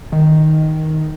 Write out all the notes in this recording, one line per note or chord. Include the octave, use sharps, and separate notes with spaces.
D#3